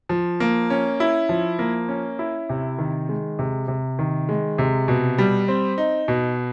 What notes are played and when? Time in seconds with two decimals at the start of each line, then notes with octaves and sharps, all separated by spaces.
0.09 F3
0.40 A#3
0.70 C#4
1.00 E4
1.29 F3
1.59 A#3
1.89 C#4
2.19 E4
2.49 C3
2.78 D#3
3.09 G#3
3.39 C3
3.68 C3
3.99 D#3
4.29 G#3
4.58 C3
4.88 B2
5.18 G3
5.48 C4
5.78 D#4
6.08 B2